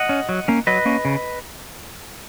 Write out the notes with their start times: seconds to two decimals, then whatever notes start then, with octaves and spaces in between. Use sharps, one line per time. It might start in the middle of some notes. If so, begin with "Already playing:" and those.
Already playing: D#5 F#5
0.09 C#4
0.29 F#3
0.48 A#3 C#4
0.67 F#3 B4 D#5
0.85 A#3 C#4
1.05 C#3